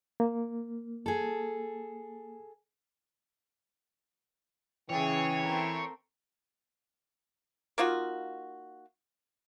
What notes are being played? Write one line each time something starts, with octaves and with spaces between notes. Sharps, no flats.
A#3
G#4 A4
C#3 E3 G#4 C#5 G5
A3 C4 A#4
A#3 D#4 F4 F#4